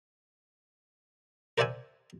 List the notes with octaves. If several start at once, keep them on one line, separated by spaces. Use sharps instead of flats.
A#4 C5 D5 E5 F#5 G#5